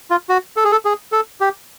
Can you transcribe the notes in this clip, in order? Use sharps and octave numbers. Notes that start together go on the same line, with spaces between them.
F4
F#4
A4
G#4
A4
G#4
A4
G4